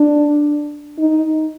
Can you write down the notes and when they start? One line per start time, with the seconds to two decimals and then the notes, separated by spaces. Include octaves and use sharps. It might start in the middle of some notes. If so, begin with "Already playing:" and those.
Already playing: D4
0.99 D#4